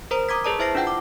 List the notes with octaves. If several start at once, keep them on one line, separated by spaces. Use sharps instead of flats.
A#4 C5 A#5
A#5 D6 D#6 G#6 B6
G#4 B4 D5 A5 A#5
E4 C5 E5 A5 A#6 C7
D4 F4 F#5 G5
D6